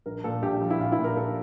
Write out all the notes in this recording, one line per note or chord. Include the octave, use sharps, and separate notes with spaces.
A#1 A#4
A#2 A4
A#1 G4
F3
E4
A#1 F4
E4
A#2
A#4
A#1 A4